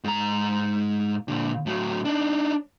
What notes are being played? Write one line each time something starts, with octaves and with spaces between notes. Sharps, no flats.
G#2 A#5
A#2 D3
A2 F#3
D4 D#4